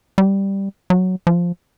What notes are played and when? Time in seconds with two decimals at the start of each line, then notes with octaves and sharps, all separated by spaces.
0.18 G3
0.90 F#3
1.27 F3